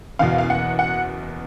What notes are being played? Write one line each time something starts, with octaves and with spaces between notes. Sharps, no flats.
F#1 E2 B2 F5
F5
F#5
F#5